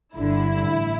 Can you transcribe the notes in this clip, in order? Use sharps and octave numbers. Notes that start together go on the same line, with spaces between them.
G1 G2 D3 E4
A1